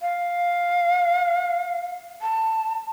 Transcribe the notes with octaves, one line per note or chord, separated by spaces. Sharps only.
F5
A5